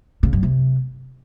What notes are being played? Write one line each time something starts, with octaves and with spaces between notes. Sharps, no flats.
C#3
F#2
C3